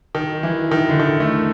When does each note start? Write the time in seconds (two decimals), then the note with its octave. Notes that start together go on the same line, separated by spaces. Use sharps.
0.15 D#3
0.43 E3
0.71 D#3
0.89 D3
1.00 D#3
1.20 A3